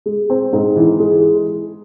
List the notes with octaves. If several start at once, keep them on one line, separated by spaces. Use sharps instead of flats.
G#3
C4
G#2
E3
G#3